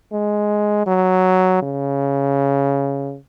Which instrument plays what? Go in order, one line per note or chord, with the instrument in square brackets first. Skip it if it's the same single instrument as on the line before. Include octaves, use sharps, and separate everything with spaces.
[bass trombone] G#3
F#3
C#3